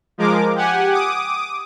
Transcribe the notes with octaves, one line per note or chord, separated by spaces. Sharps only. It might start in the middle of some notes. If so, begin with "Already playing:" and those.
F3 G#3 A#4 D6
G4 F#5 G#5
D6 D#6